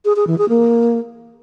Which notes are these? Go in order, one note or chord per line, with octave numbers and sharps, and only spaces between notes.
G#4
G#4
E3
G#4
A#3